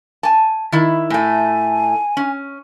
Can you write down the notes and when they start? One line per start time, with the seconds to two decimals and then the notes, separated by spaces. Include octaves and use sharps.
0.23 G#5 A5
0.72 D#3 E4
1.10 A2 A3 G#5
2.17 C#4